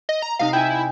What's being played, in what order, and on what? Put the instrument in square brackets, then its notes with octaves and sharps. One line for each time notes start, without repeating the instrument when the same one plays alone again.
[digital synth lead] D#5
A#5
[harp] C3 D#4 [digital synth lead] F5
[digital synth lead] E4 [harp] G5 G#5